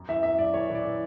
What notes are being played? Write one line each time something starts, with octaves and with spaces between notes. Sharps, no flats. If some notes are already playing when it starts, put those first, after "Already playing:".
Already playing: F#2
E3 E5
F#2 E5
F#2 D5
E3 C#5
E3
D5
E3